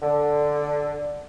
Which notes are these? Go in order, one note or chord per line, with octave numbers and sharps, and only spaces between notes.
D3